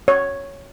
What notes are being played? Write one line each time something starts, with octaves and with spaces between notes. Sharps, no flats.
C#5